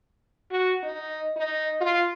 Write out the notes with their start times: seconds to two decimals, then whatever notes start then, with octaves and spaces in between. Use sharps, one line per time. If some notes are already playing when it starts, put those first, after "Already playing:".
0.51 F#4
0.83 D#4
1.36 D#4
1.80 F4